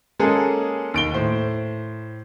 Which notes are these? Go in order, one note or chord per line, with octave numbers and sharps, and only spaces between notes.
G#3 A#3 C#4 G#4 A4
D#2 D7 G7
A2 C5